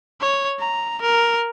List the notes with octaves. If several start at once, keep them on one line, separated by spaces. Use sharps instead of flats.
C#5
A#5
A#4